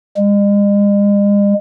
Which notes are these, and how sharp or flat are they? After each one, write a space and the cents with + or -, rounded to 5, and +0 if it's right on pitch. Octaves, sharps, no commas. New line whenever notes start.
G#3 -40